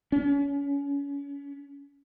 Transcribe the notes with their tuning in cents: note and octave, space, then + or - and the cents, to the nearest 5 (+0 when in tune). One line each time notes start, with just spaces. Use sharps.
C#4 +30